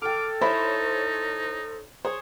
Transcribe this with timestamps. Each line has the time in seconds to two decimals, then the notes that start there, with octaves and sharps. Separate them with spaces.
0.02 A4 G5 D6 F6
0.41 D#4 E4 C5 C#5
2.05 G#4 C5 C#5